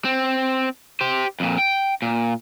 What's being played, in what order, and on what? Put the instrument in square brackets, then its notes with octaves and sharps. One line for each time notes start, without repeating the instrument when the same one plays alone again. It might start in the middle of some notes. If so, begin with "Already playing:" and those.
[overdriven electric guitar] C4
G4 C5
F2 A#2
G5
A#2